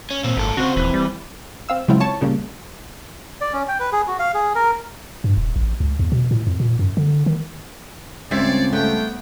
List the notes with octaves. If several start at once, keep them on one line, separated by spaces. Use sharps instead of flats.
C#4
D#2 A#2 C4
G#1 A#2 A4 D7
C#3 C4 F#4 C5
D#1 E3
G3
C4 F5 E6
C#3 F#3 G#3 C4 E4 F4
C#5 A5 C#6
A#2 C#3 G3 A#3
D5
C#4
G5
B4
G#4
F#4
F5
G#4
A#4
G2
D#1
A1
C#2
E2
B2
A2
F2
A#2
F#2
D3
D#3
C#2 C4 C#5 D5 E5
A3 B3 F4 G4 G5